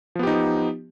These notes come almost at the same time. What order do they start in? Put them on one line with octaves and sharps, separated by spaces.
F3 B3 G4 D#4